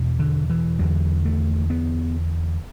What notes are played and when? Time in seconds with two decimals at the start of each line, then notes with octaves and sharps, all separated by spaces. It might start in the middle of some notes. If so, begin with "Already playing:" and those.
Already playing: E2 B2
0.19 D3
0.50 E3
0.79 E2 D3 F#3
1.25 A3
1.70 B3